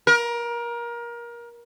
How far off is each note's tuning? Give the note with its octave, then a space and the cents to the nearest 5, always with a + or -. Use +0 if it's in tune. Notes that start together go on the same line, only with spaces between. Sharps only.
A#4 +25